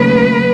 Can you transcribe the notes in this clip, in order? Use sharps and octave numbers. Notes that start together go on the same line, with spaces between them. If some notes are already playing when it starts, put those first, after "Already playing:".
Already playing: D#2 C#3 F#3 A3 B4